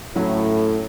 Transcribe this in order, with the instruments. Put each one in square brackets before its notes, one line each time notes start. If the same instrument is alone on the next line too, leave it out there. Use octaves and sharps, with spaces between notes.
[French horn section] A2 [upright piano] F#3 C#4 E4